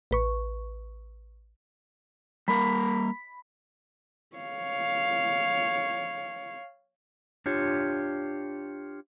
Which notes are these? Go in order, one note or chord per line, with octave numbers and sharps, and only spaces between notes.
A1 B4 C#6
G3 A#3 A#4 B5
C#5 F5
D4 F4 G4 C#5